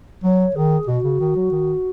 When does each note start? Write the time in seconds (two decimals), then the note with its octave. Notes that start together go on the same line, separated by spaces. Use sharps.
0.23 F#3 C#5
0.55 D#3 G#4
0.87 B2 F#4
1.04 C#3
1.20 D#3
1.36 F#3
1.51 D#3